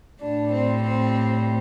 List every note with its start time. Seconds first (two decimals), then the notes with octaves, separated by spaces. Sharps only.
0.20 A2 G3 D4
0.52 C4
0.81 C4